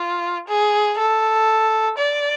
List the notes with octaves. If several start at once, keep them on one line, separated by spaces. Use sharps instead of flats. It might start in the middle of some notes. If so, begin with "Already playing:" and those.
Already playing: F4
G#4
A4
D5